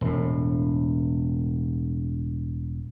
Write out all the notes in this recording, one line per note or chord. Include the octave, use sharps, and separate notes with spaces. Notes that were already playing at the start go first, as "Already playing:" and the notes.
E1 A2